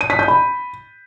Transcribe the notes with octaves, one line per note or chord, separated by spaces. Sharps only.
D#7
B6
G6
B5